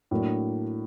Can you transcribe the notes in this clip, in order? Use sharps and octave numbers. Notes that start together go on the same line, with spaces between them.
A2 F#3 A#3 D4